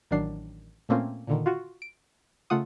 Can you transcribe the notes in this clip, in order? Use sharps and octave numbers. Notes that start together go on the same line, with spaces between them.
A1 D#3 F#3 D4 C7
A#2 A3 A#3 C4 C#4 F4
A#2 D3 D#3
F4 F#4
D7
C#3 A3 F4 F#5 D#6